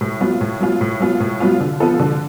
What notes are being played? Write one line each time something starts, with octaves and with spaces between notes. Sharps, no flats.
A2
F#3 B3 F4
A2
F#3 B3 F4
A2
F#3 B3 F4
A2
F#3 B3 F4
D3
F3 B3 F4 A4
D3